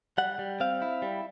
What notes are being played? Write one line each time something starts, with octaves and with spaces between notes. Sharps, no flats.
G3 F#5
G3
C4 F5
E4
G3